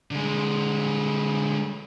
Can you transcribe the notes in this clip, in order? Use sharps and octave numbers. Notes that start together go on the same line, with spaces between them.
D3 G#3